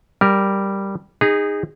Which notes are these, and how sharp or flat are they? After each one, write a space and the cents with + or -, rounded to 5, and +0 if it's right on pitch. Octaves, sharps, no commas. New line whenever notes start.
G3 +0 A#4 +0
D#4 -10 G#4 -25 A#5 +25